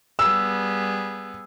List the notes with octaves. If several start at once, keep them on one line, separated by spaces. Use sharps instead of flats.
G3 B3 G#4 E6